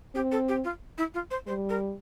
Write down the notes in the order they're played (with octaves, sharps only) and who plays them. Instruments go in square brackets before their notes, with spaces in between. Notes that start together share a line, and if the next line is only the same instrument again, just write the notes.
[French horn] C4 [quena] G4
[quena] A4
G4
F4
E4
F4
C5
[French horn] G3 [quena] C5
[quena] A#4